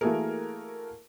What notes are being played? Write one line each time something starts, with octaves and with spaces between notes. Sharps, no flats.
E3 A3 A#3 F#4 G#4 A#4